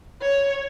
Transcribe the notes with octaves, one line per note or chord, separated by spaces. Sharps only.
C#5